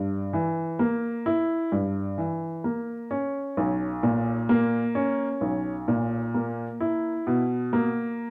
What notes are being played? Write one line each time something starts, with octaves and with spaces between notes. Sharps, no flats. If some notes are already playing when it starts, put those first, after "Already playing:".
Already playing: G2
E3
A#3
E4
G2
E3
A#3
C#4
B1
A#2
A#3
C#4
B1
A#2
A#3
E4
B2
A#3